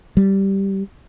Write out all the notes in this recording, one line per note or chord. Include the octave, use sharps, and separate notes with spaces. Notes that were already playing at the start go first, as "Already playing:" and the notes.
G3